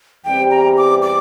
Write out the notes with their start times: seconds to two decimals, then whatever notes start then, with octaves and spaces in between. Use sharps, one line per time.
0.25 E2 E3 G3 C4 G4 G5
0.51 A#5
0.77 D6
1.02 D6